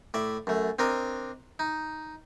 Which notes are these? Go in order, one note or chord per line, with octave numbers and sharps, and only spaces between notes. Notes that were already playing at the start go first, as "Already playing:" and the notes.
A2 D5 E5
F#2 A3
C4 D4 A#4 D#5
D#4